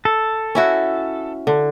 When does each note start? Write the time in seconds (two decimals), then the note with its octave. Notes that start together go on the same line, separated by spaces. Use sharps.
0.05 A4
0.55 C#4 E4 F#4
1.47 D3